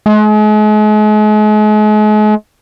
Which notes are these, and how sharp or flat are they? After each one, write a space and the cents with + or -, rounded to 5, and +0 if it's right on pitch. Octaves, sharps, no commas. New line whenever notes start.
G#3 +40